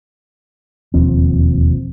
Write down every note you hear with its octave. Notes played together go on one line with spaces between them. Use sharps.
E1 D#2 F3 C4